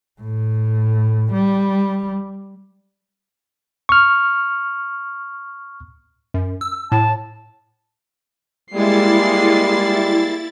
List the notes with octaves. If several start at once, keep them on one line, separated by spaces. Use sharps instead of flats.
A2
G3
C#6 F6
F#2
E6
A2 A5
G3 G#3 A#3 E4 A6 C7